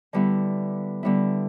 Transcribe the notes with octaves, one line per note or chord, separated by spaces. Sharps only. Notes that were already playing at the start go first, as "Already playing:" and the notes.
D3 G3 B3 E4
D3 G3 B3 E4